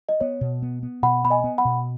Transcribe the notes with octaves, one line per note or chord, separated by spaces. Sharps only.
D#5
B3 C#5
B2
B3
B3
B2 F#5 B5
B3 B5
D#5 G#5
B3
F#5 B5
B2